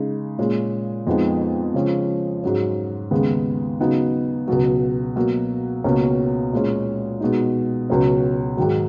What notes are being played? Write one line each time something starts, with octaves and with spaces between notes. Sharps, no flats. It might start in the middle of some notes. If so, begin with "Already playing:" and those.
Already playing: C#3 G#3 D#4
A#2 G#3 C#4
F2 F3 G#3 B3 D#4
C#3 F3 G#3 C#4
G#2 F#3 C#4
D#2 C#3 G#3 B3
C#3 F#3 B3 D#4
C#2 B2 F#3
B2 F#3 A#3
C#2 B2 A#3 C#4
A#2 G#3 C#4
B2 G#3 D#4
C#2 B2 F#3 C#4
G#2 D#3 F#3